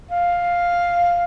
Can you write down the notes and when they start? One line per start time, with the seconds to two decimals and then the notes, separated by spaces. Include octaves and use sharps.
0.11 F5